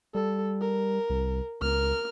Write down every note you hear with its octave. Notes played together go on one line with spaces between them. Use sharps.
G3 A4
A#4
C2
C#2 A#4 F6